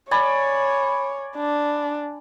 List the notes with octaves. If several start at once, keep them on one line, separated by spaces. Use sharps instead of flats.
C#5 D5 G#5 B5
D4